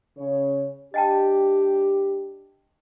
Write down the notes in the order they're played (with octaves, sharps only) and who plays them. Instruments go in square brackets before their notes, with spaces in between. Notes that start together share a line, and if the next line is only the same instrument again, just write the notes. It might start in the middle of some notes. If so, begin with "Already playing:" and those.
[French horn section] C#3 C#5
[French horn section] D4 G4 [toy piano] D#5 G5 A5